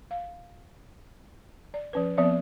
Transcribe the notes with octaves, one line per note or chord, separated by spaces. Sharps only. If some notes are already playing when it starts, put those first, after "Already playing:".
F5
D5
F3 C#4 B4
F3 B3 C4 D5 E5